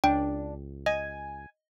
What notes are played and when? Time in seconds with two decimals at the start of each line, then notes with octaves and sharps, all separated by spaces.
0.04 C#2 D4 G5
0.86 D#5 G#5